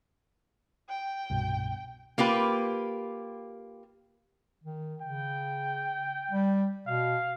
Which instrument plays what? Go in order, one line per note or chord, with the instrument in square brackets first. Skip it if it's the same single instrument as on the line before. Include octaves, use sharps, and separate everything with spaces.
[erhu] G5
[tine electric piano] C2 G2 B2
[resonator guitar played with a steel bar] A#3 F4 G4 B4
[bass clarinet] D#3
[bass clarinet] C#3 [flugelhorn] G5
[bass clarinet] G3
[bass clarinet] B2 [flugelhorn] F5